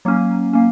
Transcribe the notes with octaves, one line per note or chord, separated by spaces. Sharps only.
F#3 A#3 C#4
A#3 C#4